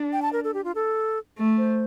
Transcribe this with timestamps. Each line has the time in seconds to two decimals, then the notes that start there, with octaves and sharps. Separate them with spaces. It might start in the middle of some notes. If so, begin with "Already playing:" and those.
Already playing: D4
0.13 G5
0.22 A5
0.33 A#4
0.44 A4
0.54 G4
0.64 F4
0.75 A4
1.37 A3
1.58 C5